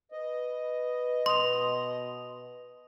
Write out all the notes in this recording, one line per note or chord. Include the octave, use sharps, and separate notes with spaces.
B4 D#5
B2 B4 C6 D#6 F7